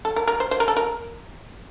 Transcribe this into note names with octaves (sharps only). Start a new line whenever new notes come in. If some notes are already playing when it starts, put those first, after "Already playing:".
A4
A#4
A#4
C5
C5
A#4
A4
A#4